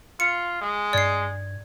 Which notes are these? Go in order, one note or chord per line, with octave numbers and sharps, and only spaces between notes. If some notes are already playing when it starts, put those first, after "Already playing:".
F4 C#7
G#3
G2 D5 G#6 C7